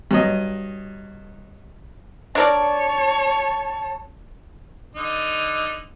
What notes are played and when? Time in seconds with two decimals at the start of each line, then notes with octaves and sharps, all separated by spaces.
0.11 G2 F#3 D#5
2.35 D4 A#4 C#5 D5 A5
4.95 D3 D#4